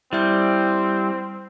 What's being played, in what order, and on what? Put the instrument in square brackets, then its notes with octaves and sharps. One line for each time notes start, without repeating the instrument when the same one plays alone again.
[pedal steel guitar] G3 [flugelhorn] C4 [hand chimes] E4 E5 G6